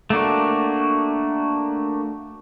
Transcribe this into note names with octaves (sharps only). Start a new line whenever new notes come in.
A3 A#3 D4 F#4